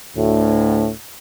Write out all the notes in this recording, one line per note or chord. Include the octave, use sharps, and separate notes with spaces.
D2 A2